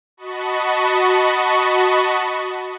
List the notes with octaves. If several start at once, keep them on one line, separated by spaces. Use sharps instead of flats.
F#4 D#5 A5 B5 C#6